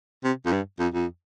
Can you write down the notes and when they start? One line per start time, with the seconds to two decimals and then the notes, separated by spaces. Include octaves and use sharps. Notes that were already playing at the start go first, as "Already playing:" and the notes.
0.23 C3
0.45 F2
0.52 G2
0.79 F2
0.93 F2